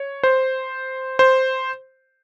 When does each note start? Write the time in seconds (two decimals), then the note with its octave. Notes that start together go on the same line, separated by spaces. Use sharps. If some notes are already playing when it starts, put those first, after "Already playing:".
Already playing: C#5
0.23 C5
1.19 C5